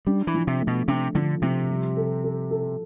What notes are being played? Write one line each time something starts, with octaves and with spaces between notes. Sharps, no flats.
G3 D4
E3
F3
C3
A3
B2
C3 D4
D3 F3
C3 F3
G3
A4
A4
A4